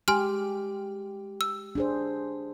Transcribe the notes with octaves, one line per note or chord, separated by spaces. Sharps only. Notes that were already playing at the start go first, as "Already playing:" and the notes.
G#3 G4 G#5 C6 F6
E6
D4 G#4 C5